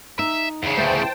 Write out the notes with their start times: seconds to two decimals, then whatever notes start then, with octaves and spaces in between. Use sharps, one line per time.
0.19 D#4 E5
0.63 E2 C#3
0.77 D2 E3 C#4 C5 G5 A5